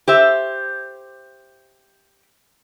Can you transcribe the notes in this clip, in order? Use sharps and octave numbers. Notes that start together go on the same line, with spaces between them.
G4 C5 E5